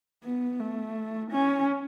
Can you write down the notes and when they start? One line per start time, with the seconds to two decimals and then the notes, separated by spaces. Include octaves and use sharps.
0.24 B3
0.59 A3
1.31 C#4